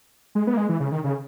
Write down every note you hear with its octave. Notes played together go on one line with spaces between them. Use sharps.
G#3
B3
A#3
G#3
E3
C#3
D#3
C#3